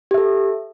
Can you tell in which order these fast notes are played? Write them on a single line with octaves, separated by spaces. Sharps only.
G4 E5 A4